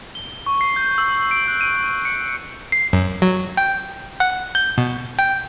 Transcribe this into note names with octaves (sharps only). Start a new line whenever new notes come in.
G7
C#6
C7
G6
E6
D7
F#6
D#7
D#7
C#7
C7
F#2
F#3
G5
F#5
G6
B2
G5